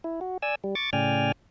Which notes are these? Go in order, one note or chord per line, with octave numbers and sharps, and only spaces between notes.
E4
F#4
D5 G#5 E6
G3
C#6 D6 A6
A2 C#3 D5 G5 G#5 F6